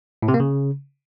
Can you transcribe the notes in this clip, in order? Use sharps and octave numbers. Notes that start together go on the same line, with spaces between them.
A2
C3
A#3
C#3